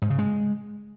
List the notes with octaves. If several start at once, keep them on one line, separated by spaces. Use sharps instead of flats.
G#2
C#3
G#3